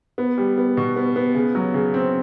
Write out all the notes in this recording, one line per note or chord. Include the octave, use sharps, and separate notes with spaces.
B3
G3
B3
B2
B3
B3
C#3
F#3
C#3
C4